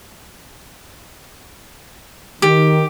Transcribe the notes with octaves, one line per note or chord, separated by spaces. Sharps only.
D#3 G4